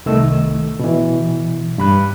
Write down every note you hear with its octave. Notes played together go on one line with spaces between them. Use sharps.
C2 D#3 A3 E6
B2 E3
G2 B5 F#6